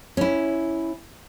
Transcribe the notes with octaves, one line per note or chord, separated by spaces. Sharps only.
C#4 E4